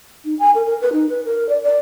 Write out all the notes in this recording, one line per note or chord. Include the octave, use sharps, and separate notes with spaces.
D#4
G#5
A#4
A#4
B4
D#4
B4
A#4
D5
D5